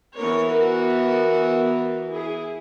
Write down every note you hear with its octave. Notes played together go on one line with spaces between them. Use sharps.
E3 B3 A#4 C#5
F#4 A#4
E4 G#4